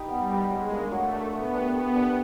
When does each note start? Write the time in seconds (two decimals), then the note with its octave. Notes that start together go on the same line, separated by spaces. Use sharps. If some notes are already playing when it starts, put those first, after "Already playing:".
Already playing: D#4 G4 B4
0.09 G3 B3
0.30 D#4 G4 B4
0.50 F#3 G#3
0.71 A#3 D4
0.92 F#3 A3
1.12 A#3 D4
1.33 A3 B3
1.54 D4 G4
1.75 A3 B3
1.96 D4 G4